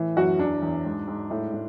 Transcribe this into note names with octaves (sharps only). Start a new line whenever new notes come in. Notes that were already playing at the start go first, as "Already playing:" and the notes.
Already playing: A2 E3
F#2 F#4
E2 D4
E2
G#2
G#2
A2
A2